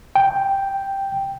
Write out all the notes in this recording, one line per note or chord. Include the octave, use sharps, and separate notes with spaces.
G5